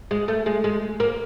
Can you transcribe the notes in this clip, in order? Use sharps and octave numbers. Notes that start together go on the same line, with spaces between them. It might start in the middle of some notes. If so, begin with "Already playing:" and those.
G#3
A3
G#3
G#3
A#3